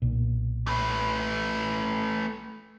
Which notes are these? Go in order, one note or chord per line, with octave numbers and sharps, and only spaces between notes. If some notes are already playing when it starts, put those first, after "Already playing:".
B1 A#2
A3 B4